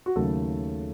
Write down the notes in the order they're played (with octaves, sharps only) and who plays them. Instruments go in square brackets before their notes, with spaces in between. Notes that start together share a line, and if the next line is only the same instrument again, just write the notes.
[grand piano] F#4
D#2 C#3 F#3 A3 A4